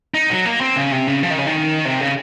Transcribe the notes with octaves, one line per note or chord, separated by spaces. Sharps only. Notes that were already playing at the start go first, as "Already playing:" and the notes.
D#4
F#3
A#3
C4
C#3
C3
C#3
F3
D#3
C#3
D#3
C3
C#3